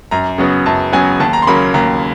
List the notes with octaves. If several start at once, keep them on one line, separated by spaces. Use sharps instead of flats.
F#2 A#5
C#3 F#3 B3
F#2 A5
C#3 F#3 B3 G#5
D#2 A5
A#5
C6
C#3 F#3 A#3 B5
D#2 A#5